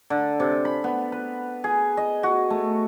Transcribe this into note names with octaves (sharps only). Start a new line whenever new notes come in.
D3
C3
B5
B3
B4
G#4
D#5
F#4
A3